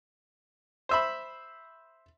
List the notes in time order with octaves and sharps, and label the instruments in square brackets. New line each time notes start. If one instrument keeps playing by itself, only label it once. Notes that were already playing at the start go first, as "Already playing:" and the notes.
[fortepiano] C5 E5 B5